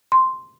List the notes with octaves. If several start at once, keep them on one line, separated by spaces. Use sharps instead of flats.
C6